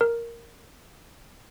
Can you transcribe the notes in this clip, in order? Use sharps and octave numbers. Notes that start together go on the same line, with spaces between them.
A#4